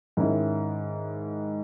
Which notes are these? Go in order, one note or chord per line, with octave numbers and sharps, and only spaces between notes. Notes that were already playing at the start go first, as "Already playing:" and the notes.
G#2 D#3 G#3 C#4 E4